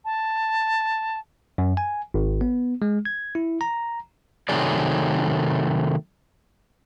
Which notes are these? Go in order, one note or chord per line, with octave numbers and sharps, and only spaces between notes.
A5
F#2
G#5
G#1
B3
G#3
G#6
E4
A#5
C3 D#3 F#3 A3 G#4 D5